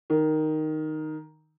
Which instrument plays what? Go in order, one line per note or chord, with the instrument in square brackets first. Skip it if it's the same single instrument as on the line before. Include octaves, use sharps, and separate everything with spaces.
[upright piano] D#3